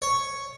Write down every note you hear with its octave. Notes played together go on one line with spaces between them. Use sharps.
C#5